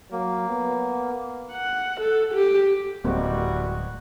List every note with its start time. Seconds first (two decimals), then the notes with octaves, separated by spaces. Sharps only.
0.12 F#3 A#3
0.50 B3
1.52 F#5
2.00 A4
2.34 G4
3.04 D1 E2 G3 G#3 A#3 C4 F#4